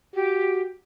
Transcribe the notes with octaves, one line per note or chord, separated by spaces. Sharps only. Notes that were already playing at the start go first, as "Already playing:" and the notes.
F#4 G4